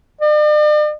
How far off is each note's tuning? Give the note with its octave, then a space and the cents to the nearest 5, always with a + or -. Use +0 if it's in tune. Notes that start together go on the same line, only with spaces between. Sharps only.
D5 +45